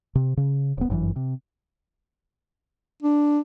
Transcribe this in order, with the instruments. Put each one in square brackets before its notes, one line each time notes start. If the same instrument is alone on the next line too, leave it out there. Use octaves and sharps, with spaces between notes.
[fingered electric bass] C3
C#3
D#1 B3
G1 F#2 D3 E3
C3
[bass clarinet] D4